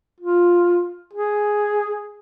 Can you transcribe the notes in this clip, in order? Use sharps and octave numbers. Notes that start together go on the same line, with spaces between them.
F4
G#4